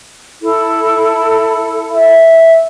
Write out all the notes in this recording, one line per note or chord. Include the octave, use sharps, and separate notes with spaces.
E4 A4
E5